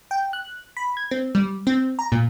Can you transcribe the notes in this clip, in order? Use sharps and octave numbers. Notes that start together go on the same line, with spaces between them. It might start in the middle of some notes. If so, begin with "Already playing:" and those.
G5
F#6
B5
G#6
C4
G3
C4
A#5
A#2